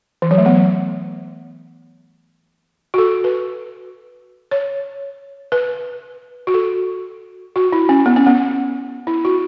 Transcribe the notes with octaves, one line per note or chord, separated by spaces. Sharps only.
E3
F#3
A3
B3
F#4
A4
B4
C#5
B4
F#4
A4
F#4
E4
C#4
B3
C#4
B3
E4
F#4